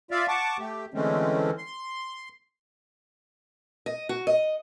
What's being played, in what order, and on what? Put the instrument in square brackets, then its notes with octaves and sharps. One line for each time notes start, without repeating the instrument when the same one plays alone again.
[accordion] F4 D5 E5 F5
F#5 A5 C#6 D6
A3 G4
D3 E3 G#3 A3 C4 C#4
C6
[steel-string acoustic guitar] D#5
F#4
D#5